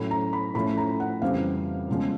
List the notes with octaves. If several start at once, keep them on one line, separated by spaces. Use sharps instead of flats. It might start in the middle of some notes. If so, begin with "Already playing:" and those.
Already playing: A2 F#3 A3 C#4 B5
A#5
B5
A2 F3 A3 C#4 B5
A#5
F#5
F2 C#3 E3 G3 C4 F5
E2 C#3 F3 G#3